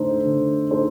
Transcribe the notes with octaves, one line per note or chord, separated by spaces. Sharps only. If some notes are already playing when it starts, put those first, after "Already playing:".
Already playing: D3 A3 D#4 A4 C5
D3
A3 D#4 A4 C5